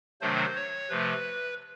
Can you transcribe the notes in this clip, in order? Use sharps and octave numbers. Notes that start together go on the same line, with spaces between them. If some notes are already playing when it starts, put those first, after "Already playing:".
C3 D#3 F#3 A3 D4 C5
C#5
C3 F3 A3 B4